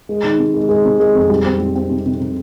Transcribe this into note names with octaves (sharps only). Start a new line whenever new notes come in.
G#3
D#3
C3
G#3
G#3
C3
G#3
F2
G3
C4
G3
C4
C3
C3
C3